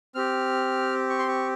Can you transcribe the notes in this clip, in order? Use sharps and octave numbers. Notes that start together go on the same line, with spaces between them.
C4 G4 F6
C#6
C6
C#6